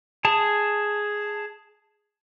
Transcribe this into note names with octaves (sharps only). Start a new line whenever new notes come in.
G#4 A5